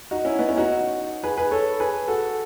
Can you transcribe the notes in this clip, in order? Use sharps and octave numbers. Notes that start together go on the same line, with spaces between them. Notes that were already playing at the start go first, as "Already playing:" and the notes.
D#4 F#4
C#4 E4
B3 D#4
C#4 E4
D#4 F#4
G#4 B4
G#4 B4
A4 C#5
G#4 B4
F#4 A4